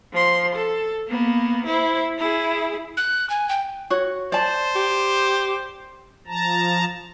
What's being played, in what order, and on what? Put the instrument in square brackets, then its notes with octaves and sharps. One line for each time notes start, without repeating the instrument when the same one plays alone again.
[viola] F3 C6
A4
A#3 B3
E4 C5
E4 G#4
[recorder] F#6
G#5
G5
[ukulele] F#4 C#5
[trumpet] C5 [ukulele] D5 A5
[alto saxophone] G4
[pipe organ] F3 A5 A#5